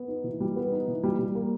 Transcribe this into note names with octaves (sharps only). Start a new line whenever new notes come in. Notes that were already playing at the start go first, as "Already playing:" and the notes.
Already playing: B3
D#4
E3
G3
B3
D#4
E3
G3
G3
A#3